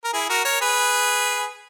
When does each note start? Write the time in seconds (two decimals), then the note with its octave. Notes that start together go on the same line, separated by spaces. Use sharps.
0.04 A#4
0.13 E4 G#4
0.29 F#4 A#4
0.45 A#4 C#5
0.61 G#4 B4